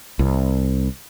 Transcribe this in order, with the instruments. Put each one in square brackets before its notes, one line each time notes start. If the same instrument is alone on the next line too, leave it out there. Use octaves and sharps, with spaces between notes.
[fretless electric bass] C2